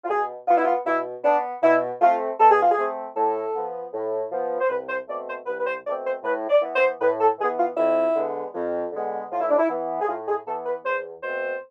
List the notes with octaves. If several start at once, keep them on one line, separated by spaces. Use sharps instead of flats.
F4
B2 G#4
B3 F4
E4
F4
B2 E4
B3 D4
B2 E4
A3 C4 F4
B2 A4
G#4
F4
G#4
A3 C4
A2 A4
F3 B3
A2
F3 B3
C5
C2 B4
C5
B2 A3 C4 D5
C5
C2 B4
B4
C5
B2 A3 C4 D5
C5
A2 B4
D5
E3 B3
C5
A2 B4
A4
E3 B3 G#4
F4
F2 E4
D3 G#3 B3
F2
D3 G#3 B3
A2 F4
E4
D4
E4
E3 B3
G#4
A2 F4
G#4
E3 B3 A4
B4
E2 C5
B2 A3 C4 C5